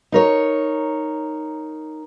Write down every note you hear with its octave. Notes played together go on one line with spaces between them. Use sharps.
D#4 A#4 C#5